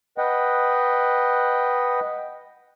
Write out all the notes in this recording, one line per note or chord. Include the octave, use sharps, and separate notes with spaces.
B4 D#5 F#5 G5